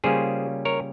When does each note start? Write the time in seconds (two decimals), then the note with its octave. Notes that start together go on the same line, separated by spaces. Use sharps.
0.04 C#3 G3 A#3 C#4 F4 G#4 C5
0.65 A#4 C#5